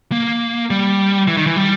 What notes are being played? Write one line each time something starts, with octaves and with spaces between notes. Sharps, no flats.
A#3
G3
E3
D#3
E3
G3